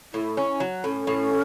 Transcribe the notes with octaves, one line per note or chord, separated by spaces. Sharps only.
A2 E4
C#4
F#3
A2 C#4
A2